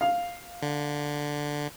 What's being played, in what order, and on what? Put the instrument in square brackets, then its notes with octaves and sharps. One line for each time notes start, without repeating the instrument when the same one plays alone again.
[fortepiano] F5
[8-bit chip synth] D3